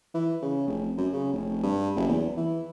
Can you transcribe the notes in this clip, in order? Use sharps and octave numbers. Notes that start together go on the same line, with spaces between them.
E3
C#3
F1
F#2
C#3
F1
G2
F#1
E2
E3